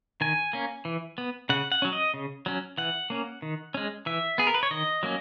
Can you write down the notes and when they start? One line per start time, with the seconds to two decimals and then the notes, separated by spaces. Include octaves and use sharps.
0.21 D#3 G#5
0.53 A#3 C#4
0.85 E3
1.18 B3
1.49 C#3 F#5
1.72 F#5
1.82 F#3 C#4
1.93 D#5
2.14 C#3
2.46 F#3 C#4
2.78 E3 F#5
3.10 A#3 C#4
3.42 D#3
3.74 G#3 C#4
4.06 E3 E5
4.38 B3 G#4
4.47 A#4
4.54 B4
4.63 C#5
4.71 D#3 D#5
5.03 F#3 A#3 C#4